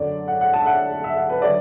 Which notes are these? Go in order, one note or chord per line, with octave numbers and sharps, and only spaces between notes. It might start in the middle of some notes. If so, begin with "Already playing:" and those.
Already playing: F#2 D3 F#3 D5
F#5
F#5
A5
E5
F#5
E5
F#5
B4
D3 F#3 D5